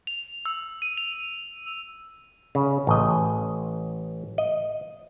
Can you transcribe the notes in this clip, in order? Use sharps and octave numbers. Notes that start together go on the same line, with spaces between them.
F7
E6
D#7
F7
C#3
A1 D#5
D#5